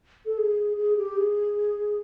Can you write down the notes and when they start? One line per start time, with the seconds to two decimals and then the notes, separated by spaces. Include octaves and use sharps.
0.26 A4
0.38 G#4
0.77 G#4
0.97 G4
1.17 G#4